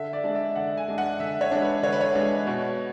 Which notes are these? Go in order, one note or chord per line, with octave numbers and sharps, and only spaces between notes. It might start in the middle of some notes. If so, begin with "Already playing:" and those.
Already playing: D3 E5
D5
G#3 D4
E5
D3 F#5
G#5
G#3 D4
F#5
D3 E5
C#5
G#3 D4
B4
D3 C#5
B4
C#5
G#3 D4
B2